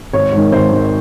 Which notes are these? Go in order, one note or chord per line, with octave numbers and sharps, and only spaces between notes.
G#1 C#5
G#2 D#3
G#1 C5
G#2 D#3